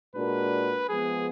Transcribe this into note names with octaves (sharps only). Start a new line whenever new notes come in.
A#2 G#3 D4 F#4 A#4 B4
F3 G#3 B3 G#4